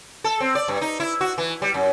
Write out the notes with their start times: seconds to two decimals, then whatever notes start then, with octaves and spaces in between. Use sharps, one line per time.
0.24 A4
0.40 C4
0.55 D5
0.68 G2
0.81 D#4
1.00 E4
1.21 F#4
1.38 E3
1.62 G3
1.74 F#2